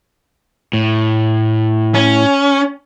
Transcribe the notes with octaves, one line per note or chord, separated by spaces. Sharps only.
A2
C#4